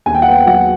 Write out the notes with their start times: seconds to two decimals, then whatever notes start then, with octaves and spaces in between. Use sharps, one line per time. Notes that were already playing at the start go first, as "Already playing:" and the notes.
0.06 D#2 G#5
0.14 G5
0.22 F#5
0.27 B3 G5
0.46 F#3 F#5